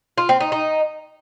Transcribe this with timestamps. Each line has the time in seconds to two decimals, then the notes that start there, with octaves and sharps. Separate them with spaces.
0.18 F4
0.29 C4
0.40 D#4
0.52 D#4